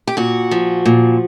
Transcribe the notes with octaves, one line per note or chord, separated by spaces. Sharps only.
G4
A#2 F#4
F3
A#2